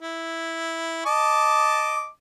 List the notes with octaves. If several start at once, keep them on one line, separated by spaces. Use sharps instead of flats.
E4
D#5 A5 D6